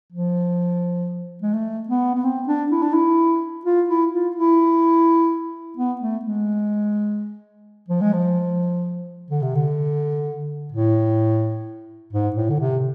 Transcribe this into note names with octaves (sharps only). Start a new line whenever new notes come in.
F3
G#3
A3
B3
B3
C4
D4
E4
D4
E4
F4
E4
F4
E4
B3
A3
G#3
F3
G#3
F3
D3
C3
D3
A2
G#2
A2
D3
C3